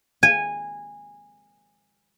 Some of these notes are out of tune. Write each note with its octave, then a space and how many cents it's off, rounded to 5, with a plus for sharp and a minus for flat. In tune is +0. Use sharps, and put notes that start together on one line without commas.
G#5 -15